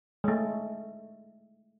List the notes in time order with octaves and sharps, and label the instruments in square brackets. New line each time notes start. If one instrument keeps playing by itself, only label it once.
[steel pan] G#3 A3